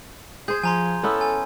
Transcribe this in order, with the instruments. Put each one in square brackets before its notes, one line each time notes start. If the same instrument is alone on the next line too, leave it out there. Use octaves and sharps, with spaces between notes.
[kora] G#4 C5 [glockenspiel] G6 G#6
[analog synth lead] F3 [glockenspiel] G#5 A#5 C6
[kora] B3 C#4 E4 [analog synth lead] A4
[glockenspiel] G#5